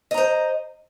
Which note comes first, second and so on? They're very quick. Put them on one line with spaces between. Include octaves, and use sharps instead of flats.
D#5 A#5 C5